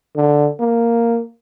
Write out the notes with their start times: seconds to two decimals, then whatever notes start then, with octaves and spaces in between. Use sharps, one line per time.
0.16 D3
0.60 A#3